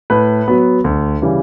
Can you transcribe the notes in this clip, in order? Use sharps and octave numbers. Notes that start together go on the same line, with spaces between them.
A2 B4
F#3 B3
D2
C#3 E3 G3